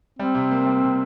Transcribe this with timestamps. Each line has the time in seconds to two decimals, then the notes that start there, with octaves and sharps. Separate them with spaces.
0.19 G3 C4
0.35 C3
0.51 A#3
0.66 G3
0.82 C3